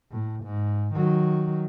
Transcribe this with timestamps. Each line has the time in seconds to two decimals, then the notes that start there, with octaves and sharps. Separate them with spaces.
0.11 A2
0.44 G#2
0.94 D#3 F#3